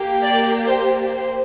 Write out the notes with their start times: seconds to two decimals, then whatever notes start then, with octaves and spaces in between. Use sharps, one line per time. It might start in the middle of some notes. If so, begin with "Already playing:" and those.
Already playing: A#3 G4
0.23 D5
0.67 C5
1.12 C5